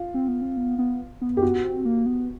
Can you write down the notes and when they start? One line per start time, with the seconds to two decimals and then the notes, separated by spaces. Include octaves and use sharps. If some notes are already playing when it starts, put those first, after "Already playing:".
Already playing: F4
0.14 C4
0.28 B3
0.42 C4
0.57 B3
0.79 B3
1.21 B3
1.37 G4
1.43 B3 F#4
1.64 C4
1.85 A#3
2.06 B3